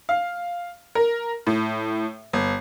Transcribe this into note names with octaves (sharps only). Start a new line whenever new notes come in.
F5
A#4
A2
G1